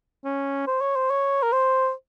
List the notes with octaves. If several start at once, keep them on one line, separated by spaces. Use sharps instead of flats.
C#4
C5
C#5
C5
C#5
A#4
C5